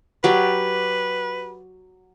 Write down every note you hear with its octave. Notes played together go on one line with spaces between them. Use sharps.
F#3 G4 B4 D5